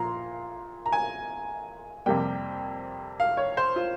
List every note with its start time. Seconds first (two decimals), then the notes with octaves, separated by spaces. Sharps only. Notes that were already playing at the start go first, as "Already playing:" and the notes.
Already playing: A#2 F3 A#5 C6
0.86 A#5
0.92 G#5
2.06 F2 C3 G3 A#3 G5
3.20 F5
3.37 C#5
3.57 C5
3.76 F4